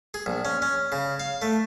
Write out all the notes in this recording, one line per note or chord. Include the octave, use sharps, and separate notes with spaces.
G#4
A#1
C#4
C#4
C#3
F5
A3